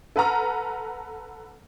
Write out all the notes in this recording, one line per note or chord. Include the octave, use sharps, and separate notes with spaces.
A4 B4 F#5 A#5 F6